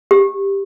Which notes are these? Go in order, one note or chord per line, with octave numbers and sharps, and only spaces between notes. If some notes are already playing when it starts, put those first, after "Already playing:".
G4